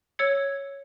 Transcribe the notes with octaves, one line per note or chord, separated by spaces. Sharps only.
C#5 E6 G#6 C#7